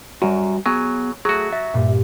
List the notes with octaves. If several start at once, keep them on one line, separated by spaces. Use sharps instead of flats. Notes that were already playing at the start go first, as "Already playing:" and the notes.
F#2 G3 F#4
F#3 B3 G#4 C#5 G#5
F#3 A3 F#4 G#4
E5 A6 A#6
G2 A#2